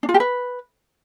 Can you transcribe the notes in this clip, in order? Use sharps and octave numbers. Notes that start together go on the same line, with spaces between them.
D4
F4
G4
B4